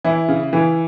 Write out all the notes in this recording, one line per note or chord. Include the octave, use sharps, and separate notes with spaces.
E3 E4
C#3
E3